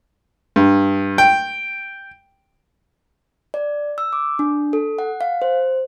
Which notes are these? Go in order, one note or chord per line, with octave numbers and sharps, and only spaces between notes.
G2
G5
D5
E6
D6
D4
A4
F#5
F5
C5